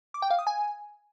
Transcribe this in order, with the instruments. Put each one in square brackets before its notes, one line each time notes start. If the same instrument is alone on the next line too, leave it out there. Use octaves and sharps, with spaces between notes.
[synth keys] D6
G5
F5
D#6
G#5